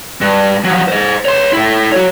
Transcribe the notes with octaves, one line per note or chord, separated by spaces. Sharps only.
G2
F3 F#3
C5 D#5
C#5 C6
E4 A4
F#4 C#5